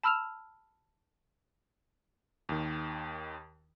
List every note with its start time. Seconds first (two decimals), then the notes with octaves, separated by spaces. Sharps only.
0.03 A5 B5 E6 F6 E7 F7
2.49 D#2 D#3